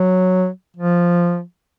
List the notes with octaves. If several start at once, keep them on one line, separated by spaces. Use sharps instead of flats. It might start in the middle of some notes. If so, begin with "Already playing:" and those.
Already playing: F#3
F3